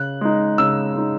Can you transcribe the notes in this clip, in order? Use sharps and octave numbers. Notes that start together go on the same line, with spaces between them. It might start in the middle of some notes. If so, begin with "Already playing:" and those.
Already playing: C#3 F#6
G#3 D#4
C#3 E6
G#3 D#4